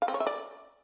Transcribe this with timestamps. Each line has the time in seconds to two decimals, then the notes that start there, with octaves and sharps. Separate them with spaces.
0.02 F5
0.08 C4
0.14 C#5
0.20 E5
0.27 D5